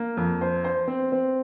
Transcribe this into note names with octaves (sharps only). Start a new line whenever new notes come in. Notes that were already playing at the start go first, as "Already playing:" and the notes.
Already playing: A#3
F2
C5
C5
C4
C4